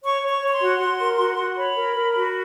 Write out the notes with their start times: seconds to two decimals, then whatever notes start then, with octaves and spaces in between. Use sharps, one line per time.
0.02 C#5 C#6
0.22 C#5
0.28 C#6
0.41 C#5 C#6
0.53 C6
0.61 F#4
0.80 F#4
0.99 A#4
1.18 F#4
1.37 F#4
1.56 C#5 B5
1.76 A#4
1.95 A#4
2.15 F#4